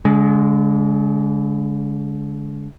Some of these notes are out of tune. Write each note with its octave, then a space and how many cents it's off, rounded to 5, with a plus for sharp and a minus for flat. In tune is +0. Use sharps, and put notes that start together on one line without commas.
D3 -40 G#3 +0